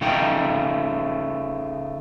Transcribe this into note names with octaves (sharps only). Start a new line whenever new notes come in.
C#3 A3 D#4 G5